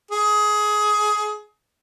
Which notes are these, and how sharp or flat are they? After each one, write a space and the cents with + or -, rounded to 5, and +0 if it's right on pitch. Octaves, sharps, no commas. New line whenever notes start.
G#4 +20